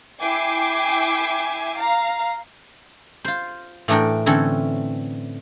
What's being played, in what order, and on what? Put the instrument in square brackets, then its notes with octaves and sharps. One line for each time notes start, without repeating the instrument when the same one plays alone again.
[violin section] E4 E5 G5 G#5 D6 C7
F5 A#5
[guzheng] F4 C5
A2 E3 A3 D4 A#4 G5
D3 E3 C4 C#4 A4